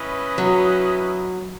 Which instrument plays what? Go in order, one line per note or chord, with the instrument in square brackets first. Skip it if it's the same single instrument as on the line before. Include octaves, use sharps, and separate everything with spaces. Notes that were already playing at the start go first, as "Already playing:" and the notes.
Already playing: [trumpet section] C#4 E4 B4 D#5
[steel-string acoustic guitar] F#3